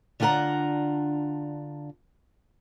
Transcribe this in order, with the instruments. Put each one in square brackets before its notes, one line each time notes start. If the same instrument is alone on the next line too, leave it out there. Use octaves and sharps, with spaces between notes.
[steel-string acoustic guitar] D3 D4 F4 G4 F#5 A#5